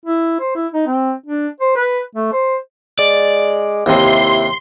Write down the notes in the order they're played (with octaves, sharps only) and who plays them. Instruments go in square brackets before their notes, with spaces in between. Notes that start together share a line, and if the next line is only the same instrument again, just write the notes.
[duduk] E4
C5
E4
D#4
C4
D4
C5
B4
A3
C5
[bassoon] G#3 [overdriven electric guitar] D5
[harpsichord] D#2 C3 [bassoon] E4 [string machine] C6